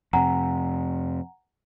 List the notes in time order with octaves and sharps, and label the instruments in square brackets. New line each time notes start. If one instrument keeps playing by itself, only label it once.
[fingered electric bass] F2 C3 [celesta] F#5 G#5 A#5